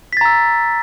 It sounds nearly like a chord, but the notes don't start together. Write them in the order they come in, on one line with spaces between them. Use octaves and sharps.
B6 A6 A#5 E6